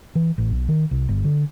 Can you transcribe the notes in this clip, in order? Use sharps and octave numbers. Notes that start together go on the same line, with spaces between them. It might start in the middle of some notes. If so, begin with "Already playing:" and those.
E3
A1
B1
D#3
C2
G1
D3